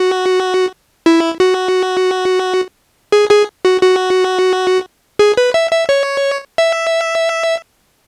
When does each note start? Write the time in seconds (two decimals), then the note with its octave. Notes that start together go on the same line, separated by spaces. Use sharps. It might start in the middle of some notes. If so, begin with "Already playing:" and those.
Already playing: F#4
1.06 E4
1.40 F#4
3.12 G#4
3.30 G#4
3.65 F#4
3.82 F#4
5.19 G#4
5.37 B4
5.54 E5
5.71 E5
5.89 C#5
6.58 E5